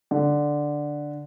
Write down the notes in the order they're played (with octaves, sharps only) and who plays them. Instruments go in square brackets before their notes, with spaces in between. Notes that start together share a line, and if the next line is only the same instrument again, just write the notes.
[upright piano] D3